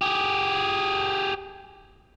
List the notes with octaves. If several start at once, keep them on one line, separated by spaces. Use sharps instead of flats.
G4 G#4